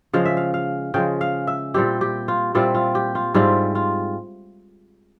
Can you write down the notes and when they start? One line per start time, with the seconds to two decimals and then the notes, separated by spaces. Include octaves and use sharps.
0.13 C#3 F3 G#3 F5
0.25 E5
0.37 F5
0.54 F5
0.94 C#3 F3 G#3 G5
1.21 F5
1.47 E5
1.74 A#2 G3 C4 E4 G4
2.01 G4
2.28 F4
2.55 A#2 G3 C4 E4 F4
2.75 F4
2.95 G4
3.15 F4
3.34 G#2 G3 C4 E4 F4
3.75 F4